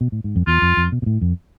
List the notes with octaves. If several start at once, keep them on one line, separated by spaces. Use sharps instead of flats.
B2
A2
G#2
F2
E2 F4
F2
F2
B2
B2
A2
F2